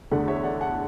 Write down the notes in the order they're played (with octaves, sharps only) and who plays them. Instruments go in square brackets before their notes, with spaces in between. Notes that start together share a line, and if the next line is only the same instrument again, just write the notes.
[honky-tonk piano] E2 D3 A3 [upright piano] D5 F#5
[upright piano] C#5 E5
D5 F#5
F#5 A5